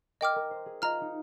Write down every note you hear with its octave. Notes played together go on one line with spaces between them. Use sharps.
A#4 D#5 G5 D6 F6
A#4
C5
G#4
F4 D#5 A#5 F6
D#4